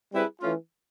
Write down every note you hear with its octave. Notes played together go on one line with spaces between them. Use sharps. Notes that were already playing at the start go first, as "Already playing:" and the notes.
G3 C4 E4 G#4 B4
E3 A3 C#4 F4